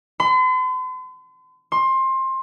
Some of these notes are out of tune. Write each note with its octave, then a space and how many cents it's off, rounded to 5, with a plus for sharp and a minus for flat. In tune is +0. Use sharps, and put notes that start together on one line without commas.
C6 -45
C6 +20